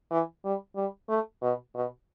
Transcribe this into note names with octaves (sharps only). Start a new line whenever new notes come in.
E3
G3
G3
A3
B2
B2